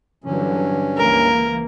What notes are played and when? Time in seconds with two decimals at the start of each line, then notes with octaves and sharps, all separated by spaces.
0.24 G2 D3 E3 F#3 C#4
0.97 C#2 E3 A#3 A#4